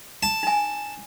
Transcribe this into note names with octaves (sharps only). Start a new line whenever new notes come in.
A5
D#4 G#5